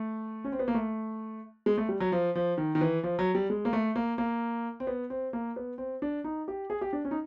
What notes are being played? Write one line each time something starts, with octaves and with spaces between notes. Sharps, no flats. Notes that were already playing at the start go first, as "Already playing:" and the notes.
Already playing: A3
C#4
C4
B3
A#3
A3
G#3
A3
G3
F#3
F3
F3
D#3
D#3
E3
F3
F#3
G3
G#3
A#3
A3
A#3
A#3
C4
B3
C4
A#3
B3
C4
D4
D#4
G4
G#4
G4
D4
C#4
D#4